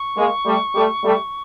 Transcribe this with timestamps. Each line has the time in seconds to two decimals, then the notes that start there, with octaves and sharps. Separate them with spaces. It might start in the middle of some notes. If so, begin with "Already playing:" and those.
Already playing: C#6
0.16 G#3 A#3
0.46 G3 A3
0.75 G3 A3
1.04 G3 A3